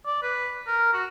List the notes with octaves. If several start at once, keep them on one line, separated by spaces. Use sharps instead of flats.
D5
B4
A#4
F#4